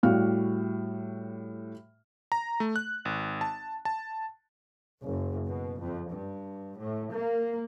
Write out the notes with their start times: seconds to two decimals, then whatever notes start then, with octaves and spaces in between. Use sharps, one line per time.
0.03 A2 G3 F#4 F5 F6
2.32 A#5
2.60 A3
2.76 F#6
3.05 G#1
3.41 A5
3.85 A5
5.01 F#1
5.46 B2
5.79 F2
6.11 G2
6.78 A2
7.11 A#3